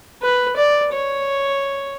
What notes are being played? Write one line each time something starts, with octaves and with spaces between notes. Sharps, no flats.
B4
D5
C#5